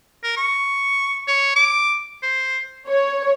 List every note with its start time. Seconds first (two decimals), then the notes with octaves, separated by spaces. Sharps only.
0.23 A#4
0.37 C#6
1.28 C#5
1.56 D6
2.23 C5
2.87 C#5